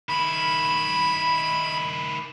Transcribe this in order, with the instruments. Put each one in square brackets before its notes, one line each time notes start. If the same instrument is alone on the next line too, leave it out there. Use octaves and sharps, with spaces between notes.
[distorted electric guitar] D#3 E4 [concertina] B5